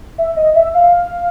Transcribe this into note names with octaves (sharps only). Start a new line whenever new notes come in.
E5
D#5
E5
F5